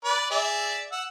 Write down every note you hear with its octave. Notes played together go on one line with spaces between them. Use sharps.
B4 D5
G#4 D5 E5
F#5 E6